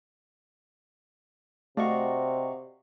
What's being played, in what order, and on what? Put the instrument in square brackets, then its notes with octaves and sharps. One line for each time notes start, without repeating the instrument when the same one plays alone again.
[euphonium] C3 [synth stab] A3 [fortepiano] F#4 F5 [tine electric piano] D5 D#5 C#6